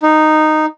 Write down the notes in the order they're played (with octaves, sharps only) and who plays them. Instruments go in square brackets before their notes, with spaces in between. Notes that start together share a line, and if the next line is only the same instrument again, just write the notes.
[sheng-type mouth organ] D#4